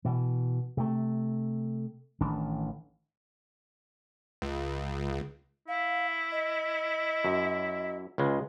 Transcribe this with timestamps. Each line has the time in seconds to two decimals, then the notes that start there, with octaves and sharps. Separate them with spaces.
0.05 B2 E3
0.77 C3 A3
2.21 A1 D#3 E3 D4
4.42 C#2
5.68 E4 F5
6.32 D#5
7.25 F#2
8.18 C#2 C#3 G#3